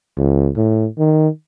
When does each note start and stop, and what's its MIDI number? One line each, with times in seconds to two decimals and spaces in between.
0.17 0.50 37
0.56 0.86 45
0.98 1.28 51